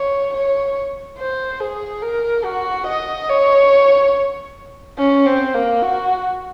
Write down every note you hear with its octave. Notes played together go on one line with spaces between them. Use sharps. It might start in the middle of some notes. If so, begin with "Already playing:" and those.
Already playing: C#5
C#5
C5
G#4
A#4
F#4
D#5
C#5
C#4
C4
A#3
F#4